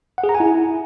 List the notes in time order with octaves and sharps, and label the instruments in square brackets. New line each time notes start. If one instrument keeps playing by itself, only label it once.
[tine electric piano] F#5
G#4
A#5
G#5
E4